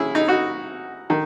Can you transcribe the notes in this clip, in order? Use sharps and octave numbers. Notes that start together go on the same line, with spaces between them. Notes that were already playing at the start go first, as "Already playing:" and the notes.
Already playing: D#2 C#4 E4 G#4
D#4
D#4 F#4
D#3